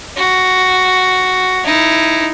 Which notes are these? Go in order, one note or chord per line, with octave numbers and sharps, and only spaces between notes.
F#4
D#4 E4